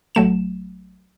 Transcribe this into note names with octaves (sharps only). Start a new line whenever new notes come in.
A1 F#3 A3 E7